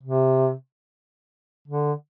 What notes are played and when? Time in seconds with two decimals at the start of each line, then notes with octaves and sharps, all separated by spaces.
0.03 C3
1.68 D3